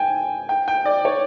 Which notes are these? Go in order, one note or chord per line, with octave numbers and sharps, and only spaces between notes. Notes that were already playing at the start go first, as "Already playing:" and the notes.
Already playing: G5 G#5
G5
G5
D5
C#5